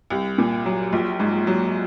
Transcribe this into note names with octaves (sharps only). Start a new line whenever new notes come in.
C2
A#2
F#3
A#1
G#2
F#3